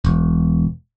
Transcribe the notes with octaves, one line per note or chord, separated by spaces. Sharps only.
E1